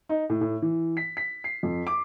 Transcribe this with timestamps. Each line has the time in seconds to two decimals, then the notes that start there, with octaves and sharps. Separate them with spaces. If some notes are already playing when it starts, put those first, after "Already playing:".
0.09 D#4
0.29 A2
0.41 A2
0.62 E3
0.97 B6
1.17 B6
1.44 C7
1.63 F2
1.87 D6